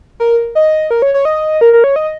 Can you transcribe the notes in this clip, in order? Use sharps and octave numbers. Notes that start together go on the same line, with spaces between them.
A#4
D#5
A#4
C#5
C#5
D#5
A#4
A#4
C#5
D#5